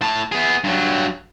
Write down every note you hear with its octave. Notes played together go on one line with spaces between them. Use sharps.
A2 A5
B3 G#4
G2 F#3